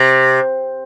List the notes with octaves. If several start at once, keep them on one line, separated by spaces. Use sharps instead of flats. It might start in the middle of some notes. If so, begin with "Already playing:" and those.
Already playing: C3